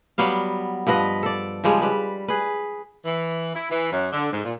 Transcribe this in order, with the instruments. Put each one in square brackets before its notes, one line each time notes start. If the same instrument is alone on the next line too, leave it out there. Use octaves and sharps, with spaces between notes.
[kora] F#3 G3 B3 F5
G2 F3 B4 D#5
A4 D5
C#3 F3 G3 G#3
G3 B4
G#4 B4
[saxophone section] E3
E4
E3
F#2
D3
G#2
A#2